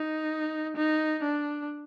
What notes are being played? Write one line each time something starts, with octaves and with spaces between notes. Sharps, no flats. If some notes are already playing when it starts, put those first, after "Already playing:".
Already playing: D#4
D#4
D4